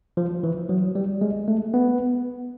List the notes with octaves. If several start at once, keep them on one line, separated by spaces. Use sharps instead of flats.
F3
E3
F#3
G3
G#3
A3
B3